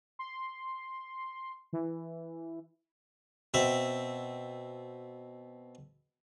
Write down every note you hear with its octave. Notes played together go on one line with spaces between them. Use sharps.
C6
E3
B2 C4 E5